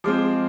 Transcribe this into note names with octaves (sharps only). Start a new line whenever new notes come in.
F3 G#3 C4 D6